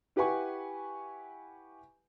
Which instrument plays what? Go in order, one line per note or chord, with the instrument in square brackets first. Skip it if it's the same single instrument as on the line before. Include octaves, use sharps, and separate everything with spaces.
[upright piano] E4 G4 B4 F#5 G#5 C#6